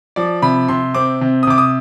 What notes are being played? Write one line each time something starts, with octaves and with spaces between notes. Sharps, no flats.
F3 D5
C3 B5
C3 C6
C4 D6
C3
D#6
C3 D6
D#6